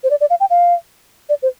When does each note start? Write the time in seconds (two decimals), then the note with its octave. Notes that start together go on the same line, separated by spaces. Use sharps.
0.04 C5
0.10 D5
0.21 D5
0.30 F5
0.40 G5
0.50 F5
1.29 D5
1.42 C5